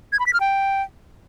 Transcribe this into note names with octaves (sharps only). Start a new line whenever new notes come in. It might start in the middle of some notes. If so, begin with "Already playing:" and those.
G#6
B5
B6
F6
G5